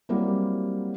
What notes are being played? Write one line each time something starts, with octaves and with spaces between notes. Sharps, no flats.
F#3 G3 A#3 C4 E4